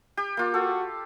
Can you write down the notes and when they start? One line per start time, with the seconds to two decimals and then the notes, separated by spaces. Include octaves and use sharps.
0.17 G4
0.37 A#3 F4
0.54 F#4 A4